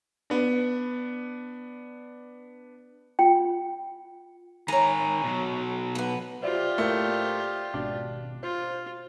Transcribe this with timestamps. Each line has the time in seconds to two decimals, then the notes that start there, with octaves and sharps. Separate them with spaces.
0.30 B3 D4
3.19 F4 G5
4.68 D#3 C#5 G#5 A#5
5.24 B2 F#3
5.95 A#3 B3
6.43 F4 G4 C5 D5 E5
6.78 A2 A3 A#3
7.74 G#1 B2 D4
8.43 F4 C5